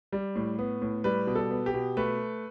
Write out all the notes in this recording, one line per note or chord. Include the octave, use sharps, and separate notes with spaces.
G3
A2
B3
A2
G3 B4
B2
A4
B3
G4
B2
A3 B4